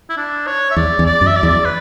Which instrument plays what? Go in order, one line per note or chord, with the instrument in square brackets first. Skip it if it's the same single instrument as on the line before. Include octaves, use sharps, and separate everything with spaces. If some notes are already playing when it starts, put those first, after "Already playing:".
[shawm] E4
D4
C#5
E5
[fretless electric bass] E2 [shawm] D5
[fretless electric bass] E2
[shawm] D5
[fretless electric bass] F#2
[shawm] E5
D5
[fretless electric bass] E2
[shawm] B4